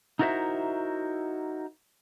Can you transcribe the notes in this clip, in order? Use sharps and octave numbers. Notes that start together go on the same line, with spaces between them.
D#4 E4 F#4 A#4 C5 E5